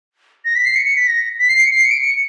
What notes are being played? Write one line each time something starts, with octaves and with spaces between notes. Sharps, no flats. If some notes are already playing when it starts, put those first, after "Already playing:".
A#6
B6
C7
C#7
C#7
B6
A#6
B6
C7
C#7
C7
C#7
D7
C#7